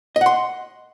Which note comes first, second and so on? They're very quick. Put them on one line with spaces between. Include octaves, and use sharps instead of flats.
D#5 F#5 C6